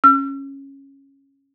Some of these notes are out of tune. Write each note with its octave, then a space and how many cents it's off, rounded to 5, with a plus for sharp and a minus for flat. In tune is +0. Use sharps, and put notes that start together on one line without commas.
C#4 -15 E6 +45